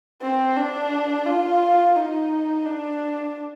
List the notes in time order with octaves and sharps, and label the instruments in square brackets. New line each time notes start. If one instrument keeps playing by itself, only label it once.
[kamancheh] C4
D4
F4
D#4
D4